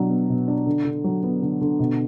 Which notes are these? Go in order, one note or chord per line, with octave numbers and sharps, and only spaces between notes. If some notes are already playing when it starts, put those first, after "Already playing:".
Already playing: B2 F#3 D4
B3
B2
D4
D3
D3
F#3
B3
D3
D3
B2